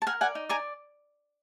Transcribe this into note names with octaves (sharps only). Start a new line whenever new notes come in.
A5
A#4 F#5 G#5
D5 F#5 G#5
D#4
D5 G#5 A#5